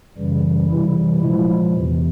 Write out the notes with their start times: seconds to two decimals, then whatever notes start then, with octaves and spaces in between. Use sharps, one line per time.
0.18 F#2 C#3 E3 G3
0.69 C3 E3 G3 E4
1.21 A#2 F3 G#3 E4
1.74 E2 C3 E3